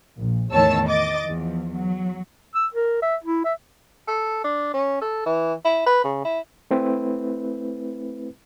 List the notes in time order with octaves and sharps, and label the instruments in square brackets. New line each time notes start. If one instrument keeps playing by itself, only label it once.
[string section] A#1
E2 A2 D#3 C#5 A5 E6
D#5 D6 A6
E2 F3
F#3
[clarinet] E6
A#4
E5
E4
E5
[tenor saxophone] A4
D4
C#4
A4
E3
E4
B4
C#3
E4
[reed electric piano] A3 C4 E4 B4